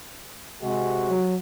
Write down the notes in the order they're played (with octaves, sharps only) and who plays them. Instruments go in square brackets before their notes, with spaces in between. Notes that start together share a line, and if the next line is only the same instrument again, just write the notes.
[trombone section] C3 G#3 [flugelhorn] F#4
[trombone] F#3